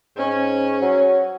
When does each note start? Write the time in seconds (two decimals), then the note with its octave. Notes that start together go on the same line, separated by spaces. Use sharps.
0.17 G#2 C#4
0.82 F#3